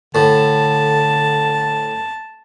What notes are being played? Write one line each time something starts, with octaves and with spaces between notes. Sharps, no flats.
A2 D3 A5